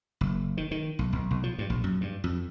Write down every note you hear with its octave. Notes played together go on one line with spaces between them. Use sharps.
F#1
D#3
D#3
B1
B1
B1
F3
G2
A#1
F#2
G2
F2